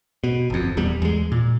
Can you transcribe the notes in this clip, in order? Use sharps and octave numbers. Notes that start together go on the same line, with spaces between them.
B2
G1 F2
D#1 E2 G3 B3
E2 G#3
A#2